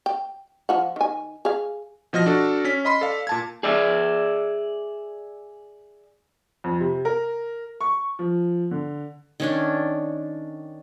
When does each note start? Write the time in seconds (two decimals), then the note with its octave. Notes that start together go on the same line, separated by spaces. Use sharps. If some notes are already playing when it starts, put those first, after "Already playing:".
0.06 G5
0.69 F3 F4 F#5
0.96 D#3 G#5
1.45 G#4 F5
2.13 B2 F3 D#5 F6 A#6
2.26 D4 F#4 A4
2.65 C#4 B6
2.85 D#5 B5 C6
3.01 A4 D5 F5
3.27 A#2 A5 G#6
3.63 G#4 D5 E5
6.64 F2
6.80 C3
7.05 A#4
7.81 C#6
8.19 F3
8.71 D3
9.40 D#3 C#4 D4